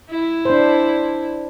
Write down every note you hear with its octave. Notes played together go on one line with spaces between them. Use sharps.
E4
D4 C5